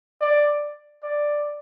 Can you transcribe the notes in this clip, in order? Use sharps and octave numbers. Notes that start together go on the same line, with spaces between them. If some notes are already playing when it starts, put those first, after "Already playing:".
D5
D5